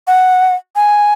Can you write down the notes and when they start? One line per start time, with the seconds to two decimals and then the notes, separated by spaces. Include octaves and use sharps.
0.07 F#5
0.76 G#5